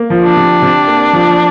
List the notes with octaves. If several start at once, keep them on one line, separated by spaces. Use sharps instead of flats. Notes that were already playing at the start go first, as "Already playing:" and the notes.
Already playing: A#3
F3
D4
C3
C3
A#3
F3